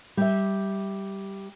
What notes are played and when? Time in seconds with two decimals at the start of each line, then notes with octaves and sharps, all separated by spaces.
0.17 G3 E5